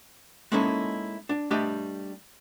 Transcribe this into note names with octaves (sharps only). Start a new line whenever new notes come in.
G#3 A#3 C#4 D#4 E4 A4
D4
G3 A3 D4 G4 D#5